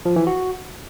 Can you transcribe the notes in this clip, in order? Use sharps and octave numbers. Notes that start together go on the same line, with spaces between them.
F3
E3
F#4